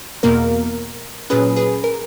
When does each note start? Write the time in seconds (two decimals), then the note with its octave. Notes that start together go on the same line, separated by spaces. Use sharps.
0.23 E2 B2 A#3 A#4
1.30 A#2 F#3 C#4 G#4 B4
1.56 G#4 B4
1.84 A#4